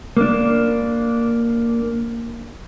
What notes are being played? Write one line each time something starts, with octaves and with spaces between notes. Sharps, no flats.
A#3 D4